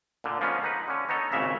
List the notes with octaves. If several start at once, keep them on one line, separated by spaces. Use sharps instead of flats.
A#2 D3
F3 G#3 A#3 B3 C#4
D#4 B4
D3 C#4
B3 D#4 A4 C#5
G#1 A#2 C#3 E5 A#5